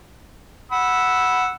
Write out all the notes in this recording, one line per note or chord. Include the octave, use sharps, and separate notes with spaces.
F#5 B5 E6